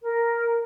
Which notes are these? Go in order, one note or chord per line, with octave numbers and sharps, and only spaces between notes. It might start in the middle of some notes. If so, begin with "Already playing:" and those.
A#4